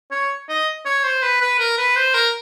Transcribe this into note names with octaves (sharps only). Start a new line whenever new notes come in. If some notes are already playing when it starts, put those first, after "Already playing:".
C#5
D#5
C#5
C5
B4
B4
A#4
B4
C5
A#4